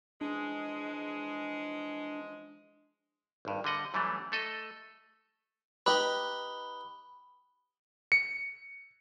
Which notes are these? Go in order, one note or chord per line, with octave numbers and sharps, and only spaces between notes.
E3 F3 G#3 D4
G#1 G2
D3 G3 D#5 F#5
F#2 E3 F#3 G3 A3
A3 A4 D#5
D#4 G4 B4 B5 G7
C#7